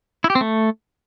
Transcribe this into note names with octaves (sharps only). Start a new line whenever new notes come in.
E4
G4
C4
A3